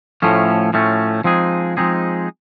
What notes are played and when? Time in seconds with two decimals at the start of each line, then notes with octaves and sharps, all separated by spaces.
0.22 A2 F3 A3 C#4
0.73 A2 F3 A3 C#4
1.24 F3 G#3 C4 D#4 G#4
1.77 F3 G#3 C4 D#4 G#4